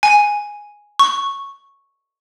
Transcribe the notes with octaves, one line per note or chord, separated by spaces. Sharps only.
G#5
C#6